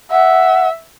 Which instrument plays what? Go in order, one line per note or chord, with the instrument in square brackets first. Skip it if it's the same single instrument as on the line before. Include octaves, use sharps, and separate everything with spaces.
[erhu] E5 [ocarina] F#5